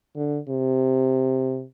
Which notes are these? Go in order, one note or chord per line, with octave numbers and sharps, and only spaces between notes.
D3
C3